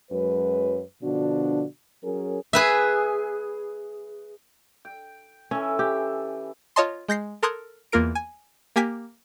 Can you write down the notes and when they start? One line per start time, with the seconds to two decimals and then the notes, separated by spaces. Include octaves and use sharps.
0.10 F#2 F#3 G#3 B4
1.02 B2 D3 F3 D4 F#4
2.03 F#3 C#4 G#4 A#4
2.53 G#4 B4 E5
4.85 G5
5.51 E3 C#4 A4 E5
5.79 G4 G5
6.76 F4 C#5 D#5 A5 C6
7.08 G#3 G6 A#6 C7
7.43 A4 A#4 C6 D#6 F#6 G#6
7.92 E2 A#3 F4 A#4 D7
8.15 G#5
8.76 A#3 G4 G#5 G#6 B6